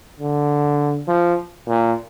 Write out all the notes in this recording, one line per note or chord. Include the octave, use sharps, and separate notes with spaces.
D3
F3
A#2